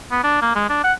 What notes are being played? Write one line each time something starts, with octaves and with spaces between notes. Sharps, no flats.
B3
D4
A#3
G#3
D4
F#5